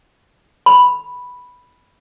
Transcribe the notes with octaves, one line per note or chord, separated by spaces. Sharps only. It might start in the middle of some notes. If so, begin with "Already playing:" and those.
B5